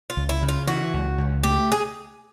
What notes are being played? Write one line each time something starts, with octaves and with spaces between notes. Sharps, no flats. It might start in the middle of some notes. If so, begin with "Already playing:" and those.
F4
C#2
E4
C#3
F4
E3 F#4
C#2
C#2
A3 G4
G#4